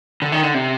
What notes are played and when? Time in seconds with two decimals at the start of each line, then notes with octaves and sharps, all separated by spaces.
0.22 D3
0.32 D#3
0.43 D3
0.54 C3